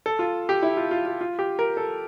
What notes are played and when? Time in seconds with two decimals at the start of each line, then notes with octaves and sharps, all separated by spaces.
0.06 A4
0.19 F4
0.49 G4
0.63 E4
0.77 F4
0.91 F4
1.06 F4
1.21 F4
1.39 G4
1.59 A#4
1.77 A4